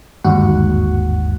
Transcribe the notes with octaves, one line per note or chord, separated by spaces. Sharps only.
G1 D#2 G#2 F#4 F#5